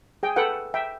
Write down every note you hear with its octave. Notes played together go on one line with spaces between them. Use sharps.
G#4 G5
A4 B4 F#5 G5
E5 G5